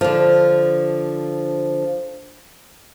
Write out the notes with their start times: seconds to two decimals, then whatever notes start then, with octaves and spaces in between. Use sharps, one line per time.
0.01 D3 F3